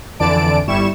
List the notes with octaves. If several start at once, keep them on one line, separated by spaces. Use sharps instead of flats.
F2 D3 E3 D5 A5 D7
G1 G3 E4 C#6 E7